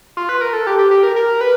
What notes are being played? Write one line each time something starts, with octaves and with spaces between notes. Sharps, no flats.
F4
B4
A#4
A4
G4
G4
G4
A#4
A#4
B4